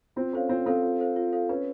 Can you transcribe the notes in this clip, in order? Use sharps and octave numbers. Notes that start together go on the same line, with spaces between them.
C4 F4
C#4 A4 C5 F5
C4 F4
C4 A4 C5 F5
F4
A4 C5 F5
F4
A4 C5 F5
C#4 B4